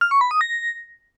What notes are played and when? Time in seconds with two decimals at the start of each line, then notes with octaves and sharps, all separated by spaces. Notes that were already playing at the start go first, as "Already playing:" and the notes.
0.01 F6
0.11 C#6
0.21 B5
0.31 D#6
0.41 A#6